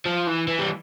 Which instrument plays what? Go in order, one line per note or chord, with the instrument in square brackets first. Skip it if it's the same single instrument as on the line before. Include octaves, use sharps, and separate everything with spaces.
[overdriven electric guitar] F3
E3
E3
G3